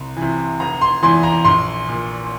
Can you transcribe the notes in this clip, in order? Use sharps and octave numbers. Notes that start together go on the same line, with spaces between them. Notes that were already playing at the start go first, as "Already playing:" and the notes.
Already playing: C2
C3 E3
F1 A#5
C6
E2 E3 C6
A#5
A#1 C6
A#2